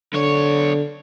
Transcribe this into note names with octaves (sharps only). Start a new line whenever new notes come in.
B1 D3 C#5